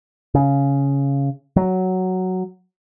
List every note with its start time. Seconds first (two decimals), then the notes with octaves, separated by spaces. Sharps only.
0.35 C#3
1.56 F#3